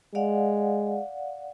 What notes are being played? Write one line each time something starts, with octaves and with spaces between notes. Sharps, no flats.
G#3 D5 F5 F#5